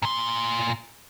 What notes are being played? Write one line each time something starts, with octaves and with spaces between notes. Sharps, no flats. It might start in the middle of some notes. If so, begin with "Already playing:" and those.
A#2 C6